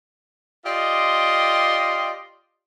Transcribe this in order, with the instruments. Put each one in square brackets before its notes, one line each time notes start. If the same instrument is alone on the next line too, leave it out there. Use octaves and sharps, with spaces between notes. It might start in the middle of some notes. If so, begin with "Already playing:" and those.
[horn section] F4 G4 D5 D#5 C6